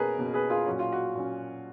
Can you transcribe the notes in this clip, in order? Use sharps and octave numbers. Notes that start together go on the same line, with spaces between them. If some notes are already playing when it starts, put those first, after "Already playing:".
Already playing: B2 A#3 C#4 G#4 A#4 B4
B2 A#3 C#4
G#4 B4
F4 G#4
A#2 F#3 C#4 F#4
F4
F#4
A#2 F#3 C#4